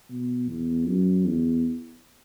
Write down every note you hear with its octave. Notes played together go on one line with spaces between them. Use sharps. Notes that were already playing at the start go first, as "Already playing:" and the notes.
B2
E2
F#2
E2